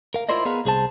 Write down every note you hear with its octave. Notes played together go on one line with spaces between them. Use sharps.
A#4 F5
E4 F4 A#4 C5 D5 D#5
B3 G#4 A#4 B4 F5
C2 G#4 C5 A5